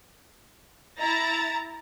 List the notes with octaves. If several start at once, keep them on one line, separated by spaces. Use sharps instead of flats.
E4 A#5 A6